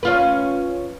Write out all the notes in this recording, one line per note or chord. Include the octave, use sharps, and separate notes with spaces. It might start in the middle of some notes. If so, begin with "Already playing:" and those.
C#4 F4 B4